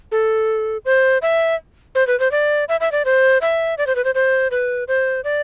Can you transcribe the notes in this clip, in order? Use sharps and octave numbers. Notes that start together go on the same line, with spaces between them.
A4
C5
E5
C5
B4
C5
D5
E5
E5
D5
C5
E5
D5
C5
B4
C5
C5
B4
C5
D5